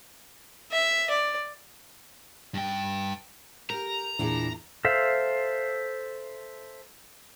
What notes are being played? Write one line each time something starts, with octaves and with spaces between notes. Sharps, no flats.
E5
D5
G2 G5
G4 A#4 A#5 G6
E2 A#2 D4 E4 G#4
A4 C5 E5 F5